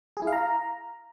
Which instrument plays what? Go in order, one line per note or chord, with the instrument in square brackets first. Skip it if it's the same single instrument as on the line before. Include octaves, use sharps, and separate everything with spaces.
[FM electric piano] G#4
E4
F5
A#5